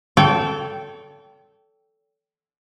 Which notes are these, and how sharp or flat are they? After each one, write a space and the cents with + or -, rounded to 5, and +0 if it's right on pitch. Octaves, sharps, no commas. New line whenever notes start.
A4 -5 C#5 +45 G5 -15